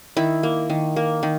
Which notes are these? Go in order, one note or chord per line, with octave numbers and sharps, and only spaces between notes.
D#3 E4
A#3
D#3
A#3
D#3